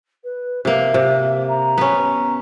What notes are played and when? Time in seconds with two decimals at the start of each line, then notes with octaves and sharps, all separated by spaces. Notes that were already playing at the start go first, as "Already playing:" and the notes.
0.24 B4
0.65 C3 A#3 E5
0.94 C3
1.48 A#5
1.78 B3 C#4